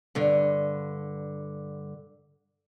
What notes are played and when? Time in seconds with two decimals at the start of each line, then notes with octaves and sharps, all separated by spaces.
0.15 G2 D3